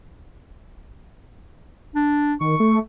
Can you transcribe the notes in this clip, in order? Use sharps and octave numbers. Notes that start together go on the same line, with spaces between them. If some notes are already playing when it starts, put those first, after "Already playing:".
D4
D#3 C#6
A3